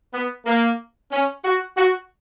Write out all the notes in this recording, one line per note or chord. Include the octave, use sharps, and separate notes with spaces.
B3
A#3
C#4
F#4
F#4